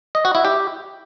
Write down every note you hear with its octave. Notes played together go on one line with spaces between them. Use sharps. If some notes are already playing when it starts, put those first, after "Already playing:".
D#5
F#4
E4
G4